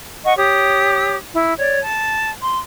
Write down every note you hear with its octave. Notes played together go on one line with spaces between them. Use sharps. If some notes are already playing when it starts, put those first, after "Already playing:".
D#5 F#5 C#6
G4 C#5 D#6
E4
C#5 D5
A5
C6